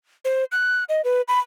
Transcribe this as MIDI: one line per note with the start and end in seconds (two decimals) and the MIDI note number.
0.25 0.44 72
0.52 0.84 90
0.89 1.01 75
1.04 1.22 71
1.28 1.39 83